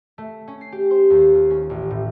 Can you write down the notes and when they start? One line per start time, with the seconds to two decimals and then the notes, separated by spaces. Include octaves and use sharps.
0.18 A3
0.48 C#4
0.61 C7
0.72 G4
0.91 C5
1.10 D#2
1.35 F4
1.50 C#4
1.70 A1
1.91 A2